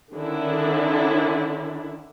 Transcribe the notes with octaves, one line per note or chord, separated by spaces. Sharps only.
D3 D#3 C#4 D4 E4